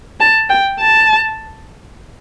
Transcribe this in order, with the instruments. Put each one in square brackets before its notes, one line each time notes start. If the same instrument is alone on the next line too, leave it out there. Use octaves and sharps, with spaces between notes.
[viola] A5
G5
A5